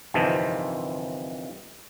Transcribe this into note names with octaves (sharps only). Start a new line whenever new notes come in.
G1 F2 C3 D#3 E3 A5